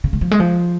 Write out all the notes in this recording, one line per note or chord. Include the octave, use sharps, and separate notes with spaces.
C#3
G#3
F3
G#3
F3